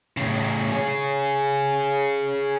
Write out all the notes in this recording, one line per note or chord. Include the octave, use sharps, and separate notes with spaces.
A2 C#3
G#4 C#5